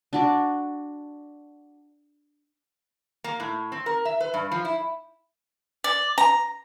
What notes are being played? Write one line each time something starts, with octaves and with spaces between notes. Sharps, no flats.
D4 F#4 D5
A#3
A2
C4
A#4
E5
B4
G2
F3
E4
D5
A#5